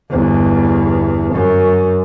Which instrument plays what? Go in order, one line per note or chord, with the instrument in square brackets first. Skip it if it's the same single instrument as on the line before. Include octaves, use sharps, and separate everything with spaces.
[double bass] G1 E2
F#2